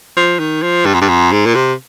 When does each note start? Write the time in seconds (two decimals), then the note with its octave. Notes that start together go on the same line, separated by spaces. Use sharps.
0.17 F3
0.39 D#3
0.63 F3
0.86 G2
0.94 F2
1.01 G2
1.08 F2
1.32 G#2
1.46 A#2
1.55 C3